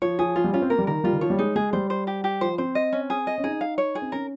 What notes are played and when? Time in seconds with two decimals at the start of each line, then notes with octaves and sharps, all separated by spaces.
0.02 F3 C#5
0.19 F3 G#4
0.36 F3 F4
0.44 G3
0.53 C#4 F4
0.62 C4
0.70 A#3 A#4
0.79 G3
0.87 D#3 A#4
1.04 G3 F4
1.13 D#3
1.21 F3 C#5
1.30 G3
1.39 G#3 D#4
1.56 G#3 G#4
1.73 G3 C5
1.90 C5
2.07 G4
2.24 G4
2.41 F3 C5
2.58 C4 C5
2.75 D#5
2.93 C#4
3.10 G#4
3.27 D#5
3.38 C#4
3.44 D#4 G#4
3.61 F5
3.78 C#5
3.95 G#4
4.02 C4
4.12 C#4 A#4